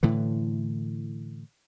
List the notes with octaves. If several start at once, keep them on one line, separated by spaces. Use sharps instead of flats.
A2 D3 E3